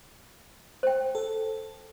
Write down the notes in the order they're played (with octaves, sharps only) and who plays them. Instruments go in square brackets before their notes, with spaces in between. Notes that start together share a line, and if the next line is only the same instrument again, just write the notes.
[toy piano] C5 G5
[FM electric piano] A4